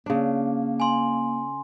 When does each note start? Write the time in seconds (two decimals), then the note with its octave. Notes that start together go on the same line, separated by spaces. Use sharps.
0.06 C#3 A#3 D4
0.80 G#5 C6